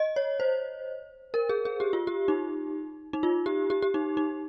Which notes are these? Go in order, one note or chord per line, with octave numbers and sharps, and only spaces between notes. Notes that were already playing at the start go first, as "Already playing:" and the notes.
Already playing: D#5
C#5
C5
A#4
G#4
G#4
G4
F4
G4
D#4
D#4
F4
G4
G4
G4
D#4
D#4